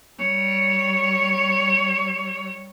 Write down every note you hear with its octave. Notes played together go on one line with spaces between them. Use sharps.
G3 C#5